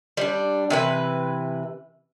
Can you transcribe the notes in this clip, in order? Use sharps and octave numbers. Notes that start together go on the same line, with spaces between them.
G3 D4
C3 E3 B4